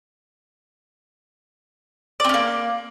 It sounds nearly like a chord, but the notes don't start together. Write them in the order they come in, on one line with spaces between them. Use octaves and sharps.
D5 C4 C#4 A#3